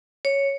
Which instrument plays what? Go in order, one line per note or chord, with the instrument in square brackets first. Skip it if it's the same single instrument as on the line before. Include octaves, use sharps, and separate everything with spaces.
[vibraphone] C#5